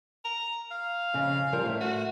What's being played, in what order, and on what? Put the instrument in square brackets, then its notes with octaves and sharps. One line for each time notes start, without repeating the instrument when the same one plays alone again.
[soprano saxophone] A#5
F5
[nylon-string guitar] F2 C#3
F3 G3 A#4
A2 E5
[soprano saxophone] F#4